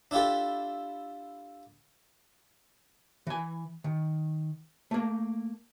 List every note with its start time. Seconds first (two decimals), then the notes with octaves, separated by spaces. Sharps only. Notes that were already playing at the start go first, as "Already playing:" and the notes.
0.11 D4 E4 F4 G4 A4
3.27 E3 G#5
3.84 D#3
4.91 A3 A#3